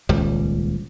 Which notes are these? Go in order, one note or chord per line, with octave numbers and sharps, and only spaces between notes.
D#1 C#2 G3